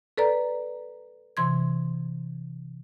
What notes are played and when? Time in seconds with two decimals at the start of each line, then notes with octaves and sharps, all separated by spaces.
0.17 A4 B4 D5 A#5
1.37 C3 E3 C6 G#6